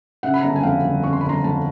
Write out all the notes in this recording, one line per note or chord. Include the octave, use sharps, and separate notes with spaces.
C#3 E5 F#5
B5
G1 A#5
A5
G#5
F2 F5 G5
G1
C#3 C#6
C6
G1 B5
A#5 C6
F2 A5 B5